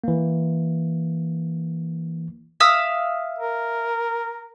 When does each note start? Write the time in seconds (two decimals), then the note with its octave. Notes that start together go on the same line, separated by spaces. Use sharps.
0.04 E3 A#3
2.60 E5 F5 D#6
3.39 A#4